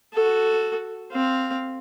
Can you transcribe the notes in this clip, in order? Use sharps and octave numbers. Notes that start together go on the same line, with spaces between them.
F#4 A4
C4 F5